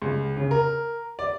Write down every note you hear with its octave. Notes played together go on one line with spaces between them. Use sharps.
C#2
C#3
A#4
D5